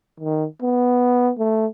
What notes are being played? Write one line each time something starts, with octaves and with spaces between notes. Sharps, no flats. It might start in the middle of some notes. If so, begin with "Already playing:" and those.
D#3
B3
A3